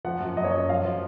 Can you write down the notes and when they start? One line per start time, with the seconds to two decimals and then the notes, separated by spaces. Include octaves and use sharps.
0.05 F3 F#5
0.20 F#2
0.37 F#2 D#5
0.44 C#5
0.51 F#2 D#5
0.69 F3 F5
0.85 F3